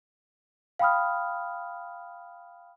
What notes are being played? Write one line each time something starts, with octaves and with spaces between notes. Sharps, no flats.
F5 G5 B5 D#6 F6